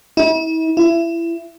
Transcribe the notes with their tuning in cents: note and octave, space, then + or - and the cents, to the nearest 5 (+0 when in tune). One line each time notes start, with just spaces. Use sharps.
E4 -40
E4 +25